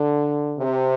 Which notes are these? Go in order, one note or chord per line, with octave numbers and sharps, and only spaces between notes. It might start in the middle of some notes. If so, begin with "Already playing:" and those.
Already playing: D3
C3